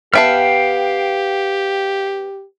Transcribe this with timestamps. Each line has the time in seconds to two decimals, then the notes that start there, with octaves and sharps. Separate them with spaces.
0.14 B3 G4 E5 F5 G5 A5 F6